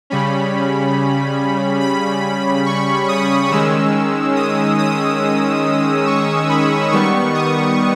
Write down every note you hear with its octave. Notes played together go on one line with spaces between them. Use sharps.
C#3 G3 C#4 B5
B5
C#6
D#6
D#3 G#3 C#4 E6
D#6
D#6
C#6
B5
D#3 G3 B3 C#6
D#6